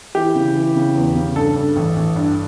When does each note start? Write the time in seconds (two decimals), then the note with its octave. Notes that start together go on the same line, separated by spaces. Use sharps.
0.15 E3 G4
0.35 C#3
0.55 E3
0.76 C#3
0.96 E2
1.15 C#3
1.36 G2 A4
1.56 G2
1.76 A1
1.96 A1
2.16 G2